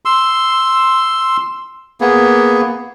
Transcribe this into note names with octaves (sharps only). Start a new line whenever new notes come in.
C6 E6
A#3 B3 G#4